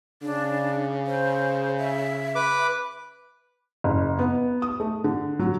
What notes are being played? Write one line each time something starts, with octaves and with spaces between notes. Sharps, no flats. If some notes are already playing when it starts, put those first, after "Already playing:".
C#3 D4
C5
E5
B4 D6
F#1
B3
D#6
A3
D3
F#3